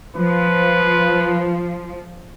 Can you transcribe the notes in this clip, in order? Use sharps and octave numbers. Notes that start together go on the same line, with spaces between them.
F3 B4